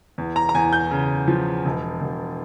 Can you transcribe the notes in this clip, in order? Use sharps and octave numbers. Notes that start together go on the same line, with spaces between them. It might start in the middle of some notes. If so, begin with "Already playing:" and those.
E2
A#5
A#5
E2 G#5
G6
C#3
F3
E1
E1